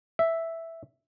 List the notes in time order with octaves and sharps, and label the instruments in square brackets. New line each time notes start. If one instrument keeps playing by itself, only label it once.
[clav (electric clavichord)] E5